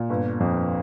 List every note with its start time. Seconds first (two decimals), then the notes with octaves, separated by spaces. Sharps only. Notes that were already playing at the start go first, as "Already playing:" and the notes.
Already playing: A#2
0.09 G1
0.40 F2